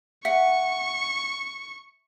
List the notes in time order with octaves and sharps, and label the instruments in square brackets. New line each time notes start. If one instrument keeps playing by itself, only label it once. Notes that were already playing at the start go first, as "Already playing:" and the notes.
[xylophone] E5 [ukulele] F#5 [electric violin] C#6